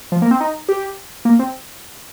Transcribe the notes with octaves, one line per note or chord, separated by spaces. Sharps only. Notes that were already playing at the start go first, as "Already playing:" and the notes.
F3
A#3
C4
D#4
G4
A#3
C4